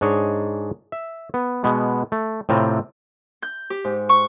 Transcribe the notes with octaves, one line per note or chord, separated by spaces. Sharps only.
G#2 D4 G#4 C#5 D#5 G#5
E5
B3
B2 G#3 B3
A3
A2 C3 C4 F4 A#5
G6
G4
G#2
C#6